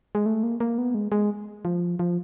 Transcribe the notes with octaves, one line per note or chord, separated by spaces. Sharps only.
G#3
A3
A#3
A#3
B3
G#3
G#3
F3
F3